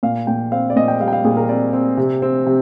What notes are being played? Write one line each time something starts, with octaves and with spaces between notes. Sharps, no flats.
A#2 F5
A#2 G5
C4 F5
D5
A#2 D#5
G5
G3 F5
G5
F5
A#2 G#4
A#4
C4 D5
C4
C3
C4
C3